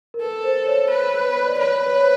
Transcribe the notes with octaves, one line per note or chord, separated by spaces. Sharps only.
A#4
A4 B4
C5
C#5
B4
D5
B4 C#5
C#5
C5